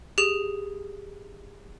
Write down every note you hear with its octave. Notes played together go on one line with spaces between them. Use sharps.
G4 G#4 E7